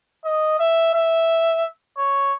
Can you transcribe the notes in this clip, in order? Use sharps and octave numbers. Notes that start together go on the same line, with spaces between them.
D#5
E5
E5
C#5